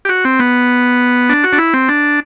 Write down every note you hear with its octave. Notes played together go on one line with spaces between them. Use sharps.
G4
F#4
C4
B3
D4
F#4
D4
E4
C4
D4